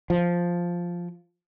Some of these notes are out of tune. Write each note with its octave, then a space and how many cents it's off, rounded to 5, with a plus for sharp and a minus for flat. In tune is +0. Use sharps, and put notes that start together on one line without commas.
F3 +0